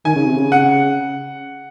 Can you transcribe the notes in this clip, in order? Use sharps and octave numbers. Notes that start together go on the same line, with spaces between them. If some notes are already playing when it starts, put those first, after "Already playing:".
D#3 G#5
C#3
C3
C#3
F#5